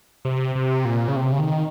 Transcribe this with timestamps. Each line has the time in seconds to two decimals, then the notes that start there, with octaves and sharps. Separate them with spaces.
0.25 C3
0.55 C3
0.85 A#2
1.08 C#3
1.16 C3
1.32 C#3
1.39 D#3